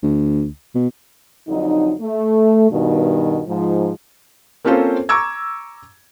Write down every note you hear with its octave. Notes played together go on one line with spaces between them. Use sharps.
D2
B2
F2 D3 F#3 D#4
A3
G2 B2 D#3
G#2 F3
A#3 C4 C#4 F4 A4 C5
A#5 C#6 D6 E6 G#6